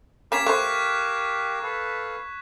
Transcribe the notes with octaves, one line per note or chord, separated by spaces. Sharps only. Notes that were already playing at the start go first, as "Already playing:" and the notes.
A#3 C#4 G4 A#4 F5 G#6 B6 E7
A3 C5 C#6 F#6 G#6
A4 B4 F5